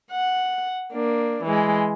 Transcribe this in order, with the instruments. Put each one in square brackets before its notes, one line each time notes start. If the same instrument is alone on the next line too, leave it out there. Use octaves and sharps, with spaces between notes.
[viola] F#5
A#3 D4
E3 G#3